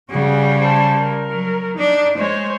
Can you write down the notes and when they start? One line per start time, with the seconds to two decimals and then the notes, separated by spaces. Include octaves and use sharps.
0.10 C#3 G3 F#4 G#4
0.60 C5 A5
0.99 A#4
1.30 F#3
1.78 D4 D#4
2.18 G#3 C5 C#5